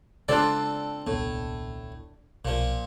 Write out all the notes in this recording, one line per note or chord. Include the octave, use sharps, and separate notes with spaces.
C#3 G#3 C4 D4 F4 A4 D5
D#1 C2 A2 B3
B1 A#2 F3